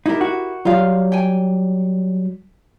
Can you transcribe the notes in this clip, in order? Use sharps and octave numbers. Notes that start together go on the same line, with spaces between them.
D#4 E4 G4 A#4
F#4
F#3 G3 F4 F5
G5 G#5